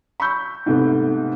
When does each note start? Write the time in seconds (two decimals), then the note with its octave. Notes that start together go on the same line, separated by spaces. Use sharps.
0.20 B5 C#6 E6 G6
0.66 G#2 C3 A3 B3